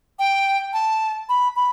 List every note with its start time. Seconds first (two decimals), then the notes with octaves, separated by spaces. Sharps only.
0.19 G5
0.73 A5
1.29 B5
1.56 B5